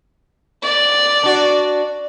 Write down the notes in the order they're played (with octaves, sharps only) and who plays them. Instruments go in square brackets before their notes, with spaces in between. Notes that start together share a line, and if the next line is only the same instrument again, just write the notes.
[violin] D5
[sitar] D4 F#4